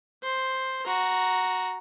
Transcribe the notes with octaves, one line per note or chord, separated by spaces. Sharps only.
C5
F#4 A#5